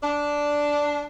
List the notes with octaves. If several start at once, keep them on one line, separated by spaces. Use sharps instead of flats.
D4